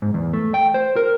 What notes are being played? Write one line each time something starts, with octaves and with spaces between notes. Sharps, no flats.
G#2
E2
A3
G5
C5
A#4